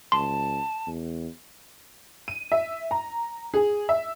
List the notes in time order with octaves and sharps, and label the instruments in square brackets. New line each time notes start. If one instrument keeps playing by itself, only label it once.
[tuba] C#2 [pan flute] A5 [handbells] C6
[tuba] E2
[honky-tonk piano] D#7
E5
A#5
G#4
E5